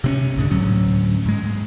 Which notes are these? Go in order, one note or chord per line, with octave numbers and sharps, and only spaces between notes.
C3 C4 C#4
C2 G#2 D3
D2 A2 F#3 C#4
G#2 G#3